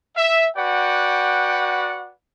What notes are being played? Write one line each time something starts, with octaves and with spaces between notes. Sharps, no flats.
E5
F#4 B4 D5 F#5 G5